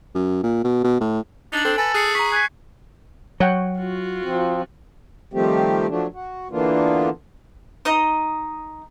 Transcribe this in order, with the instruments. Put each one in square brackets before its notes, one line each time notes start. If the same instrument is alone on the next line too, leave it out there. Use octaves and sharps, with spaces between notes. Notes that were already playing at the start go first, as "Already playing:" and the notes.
[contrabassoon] F#2
A#2
B2
B2
A2
[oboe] D4 [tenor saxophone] D#4 [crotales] C#7 F#7
[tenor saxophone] C4 [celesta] A4
[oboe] A4 [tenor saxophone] B4 [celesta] G#5
[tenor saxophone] G#4 [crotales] F#6 C7 C#7
[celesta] A#5 B6 [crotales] C#6
[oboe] G#5 [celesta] F#6 B6
[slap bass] F#3 [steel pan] C#5 F#5 G5
[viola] F4 F#4
[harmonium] F3 C4
D#3 F3 G3 A3 C4 G4
F3 F#3 A3 D4
F#4
D3 E3 A#3 B3 D4 F4
[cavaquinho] D#4 D#5 A#5